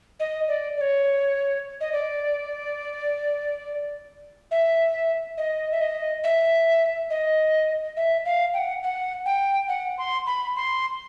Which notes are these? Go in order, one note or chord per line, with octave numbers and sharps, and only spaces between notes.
D#5
D5
D5
C#5
D#5
D5
E5
D#5
E5
D#5
E5
D#5
E5
F5
G5
F#5
F#5
G5
F#5
C6
B5
C6